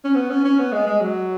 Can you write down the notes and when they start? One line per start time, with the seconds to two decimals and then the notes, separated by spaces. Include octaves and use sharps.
0.04 C#4
0.15 B3
0.30 C#4
0.45 C#4
0.59 B3
0.72 G#3
0.87 G#3
1.01 F#3